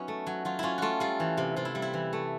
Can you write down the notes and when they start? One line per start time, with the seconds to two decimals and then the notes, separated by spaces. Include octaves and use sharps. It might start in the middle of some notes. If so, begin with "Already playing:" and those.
Already playing: F#3 B3 C#4 D#4 E4
0.08 A3
0.27 F#3
0.45 F#3 F4
0.59 C#4 E4 F4
0.78 A3 F4 F#4
1.00 G3 F4
1.20 E3
1.38 C3
1.57 C3 F4
1.65 E4
1.75 G3
1.82 E4
1.94 E3
2.13 A3